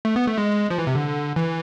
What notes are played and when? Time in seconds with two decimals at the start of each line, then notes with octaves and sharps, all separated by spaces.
0.05 A3
0.16 B3
0.27 A3
0.38 G#3
0.70 F3
0.78 E3
0.87 C3
0.95 D3
1.36 E3